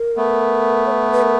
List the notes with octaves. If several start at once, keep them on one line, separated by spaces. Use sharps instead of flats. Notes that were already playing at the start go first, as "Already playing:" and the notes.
Already playing: A#4
A3 B3
C#5
B4
B4
A#4